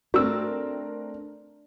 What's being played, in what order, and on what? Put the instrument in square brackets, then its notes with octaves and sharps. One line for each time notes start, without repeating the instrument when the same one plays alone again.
[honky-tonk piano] A3 C4 A#4 [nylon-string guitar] D4 [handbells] F#4 E6